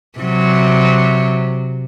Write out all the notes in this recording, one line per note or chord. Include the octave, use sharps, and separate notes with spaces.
C3 F#3